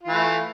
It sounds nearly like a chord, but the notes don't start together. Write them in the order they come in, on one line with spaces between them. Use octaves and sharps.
F4 E3 A3